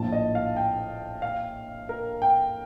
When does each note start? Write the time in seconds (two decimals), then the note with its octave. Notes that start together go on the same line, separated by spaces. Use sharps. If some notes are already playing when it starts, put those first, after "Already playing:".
Already playing: A#1 A2 F3 A#3 A5
0.12 D#5
0.35 F5
0.56 G5
1.22 F5
1.89 A#4
2.22 G5